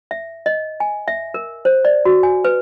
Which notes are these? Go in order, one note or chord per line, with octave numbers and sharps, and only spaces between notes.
E5
D#5
G#5
E5
A#4
C5
D5
F#4
G#5
B4